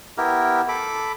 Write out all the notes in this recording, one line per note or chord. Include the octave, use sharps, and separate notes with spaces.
B3 E4 G4 A#4
A4 B5 D6